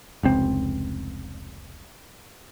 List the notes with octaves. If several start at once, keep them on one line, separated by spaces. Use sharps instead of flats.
F1 C#2 C4